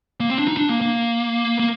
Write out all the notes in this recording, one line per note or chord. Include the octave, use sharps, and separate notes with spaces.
A#3
C4
D4
D#4
D4
A#3
A#3
A#3